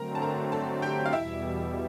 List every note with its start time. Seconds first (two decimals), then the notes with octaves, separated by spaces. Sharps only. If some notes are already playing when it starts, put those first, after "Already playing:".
Already playing: D3 F#3 A3 C4 A#4 A#5
0.15 A5
0.22 A#4 A#5
0.52 A4 A5
0.82 G4 G5
1.06 F5
1.13 E2 B2 G3 E4 E5